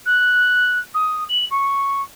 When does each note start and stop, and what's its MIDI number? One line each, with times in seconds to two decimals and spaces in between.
0.06 0.78 90
0.94 1.24 87
1.29 1.45 102
1.50 2.01 85